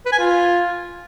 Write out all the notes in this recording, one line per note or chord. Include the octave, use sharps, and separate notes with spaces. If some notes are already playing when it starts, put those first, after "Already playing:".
B4
G#5
F4